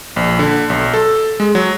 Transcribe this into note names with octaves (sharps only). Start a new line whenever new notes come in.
A#1
D3
B1
A4
G#3
F#3